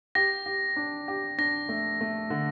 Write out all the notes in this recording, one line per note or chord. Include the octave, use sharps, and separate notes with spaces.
G4 A#6
G4
D4
G4
D4 A#6
A3
A3
D3